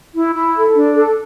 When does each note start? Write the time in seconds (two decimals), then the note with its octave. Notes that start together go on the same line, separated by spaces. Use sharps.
0.15 E4
0.35 E4
0.55 A4
0.75 D4
0.95 A4